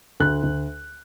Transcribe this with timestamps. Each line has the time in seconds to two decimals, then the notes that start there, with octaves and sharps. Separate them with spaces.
0.20 D2 F#6
0.43 D2